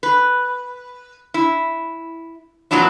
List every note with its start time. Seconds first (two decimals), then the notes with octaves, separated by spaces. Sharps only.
0.03 B4
1.34 E4
2.71 F2 A#2 E3 F#3 D4 E4